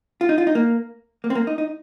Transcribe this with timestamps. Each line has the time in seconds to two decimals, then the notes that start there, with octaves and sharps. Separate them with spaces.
0.21 F4
0.29 D#4
0.38 F4
0.47 D#4
0.55 A#3
1.24 A#3
1.30 C4
1.35 A#3
1.47 D#4
1.58 D#4